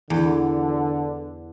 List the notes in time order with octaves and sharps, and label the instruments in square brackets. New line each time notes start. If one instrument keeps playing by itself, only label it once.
[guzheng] E2 [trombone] D3